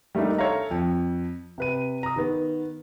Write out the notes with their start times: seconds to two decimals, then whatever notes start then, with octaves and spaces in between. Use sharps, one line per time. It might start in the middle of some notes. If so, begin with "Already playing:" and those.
0.15 G3 A3 A#3 D4 D#4
0.38 A4 C#5 E5 F5 A#5
0.71 F2
1.58 C3 B4 D#7
2.03 A#5 D#6
2.16 D#3 B3